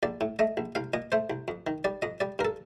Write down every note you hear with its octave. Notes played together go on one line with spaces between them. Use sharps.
A#1 D5
A2
A3 D#5
A#1
C2 F5
A#2 D#5
A3 C5
C2
F2
D#3
G3 D5
F2 D#5
G3 D5
G2 A#4
A4